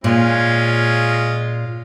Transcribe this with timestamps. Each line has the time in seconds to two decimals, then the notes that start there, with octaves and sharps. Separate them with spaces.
0.04 A#2 G#3 C#4 F4